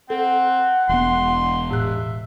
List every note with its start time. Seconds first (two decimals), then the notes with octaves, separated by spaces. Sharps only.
0.10 C4 A4 F#5
0.89 E1 B3 C6
1.71 A2 E5 F#6